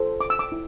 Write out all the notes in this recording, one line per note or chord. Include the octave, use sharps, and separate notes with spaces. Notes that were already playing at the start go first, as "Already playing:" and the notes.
Already playing: F4 A4 C5
D6
E6
D6
E4